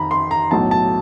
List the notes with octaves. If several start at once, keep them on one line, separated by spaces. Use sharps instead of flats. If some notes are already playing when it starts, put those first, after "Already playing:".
Already playing: F2 D#3 A#5 B5
C6
A#5
B1 A2 F#3 A5
A5